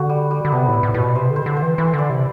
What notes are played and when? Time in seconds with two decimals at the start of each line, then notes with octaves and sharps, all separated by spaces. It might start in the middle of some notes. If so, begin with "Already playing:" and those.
Already playing: D3 F#4
0.09 G3
0.31 G3
0.45 D3
0.52 C3 B3
0.68 A2
0.73 E4
0.83 A2
0.94 A2 B4
0.99 B2
1.15 C3 C5
1.31 D3
1.36 C5
1.46 D3
1.57 C5
1.62 E3
1.78 E3 E4
1.94 D3 D5
2.10 C3